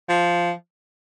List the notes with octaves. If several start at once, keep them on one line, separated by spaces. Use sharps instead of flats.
F3